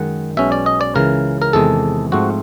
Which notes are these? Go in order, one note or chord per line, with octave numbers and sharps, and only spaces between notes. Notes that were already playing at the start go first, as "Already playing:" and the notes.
Already playing: F#2 D#3 G#3 F#5
B1 B2 G#3 C#4 E5
D5
D#5
D5
C#2 C#3 E3 A#4
A#4
E2 C3 D#3 G#3 A4
G#2 F3 A3 C4 F#4